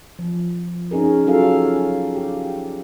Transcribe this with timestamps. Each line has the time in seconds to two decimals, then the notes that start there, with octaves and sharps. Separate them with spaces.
0.19 F3
0.91 C#4 D#4 G#4 A#4
1.27 F#3 C#4 F4 A4 F5
2.16 G4